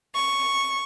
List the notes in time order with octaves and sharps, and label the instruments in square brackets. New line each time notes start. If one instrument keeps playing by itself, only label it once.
[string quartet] C#6